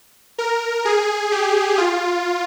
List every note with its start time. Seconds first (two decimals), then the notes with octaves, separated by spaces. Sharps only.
0.38 A#4
0.85 G#4
1.32 G4
1.78 F4